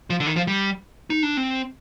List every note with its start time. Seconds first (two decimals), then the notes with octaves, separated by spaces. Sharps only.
0.10 F3
0.20 D3
0.27 D#3
0.36 F3
0.47 G3
1.10 D#4
1.23 D4
1.37 C4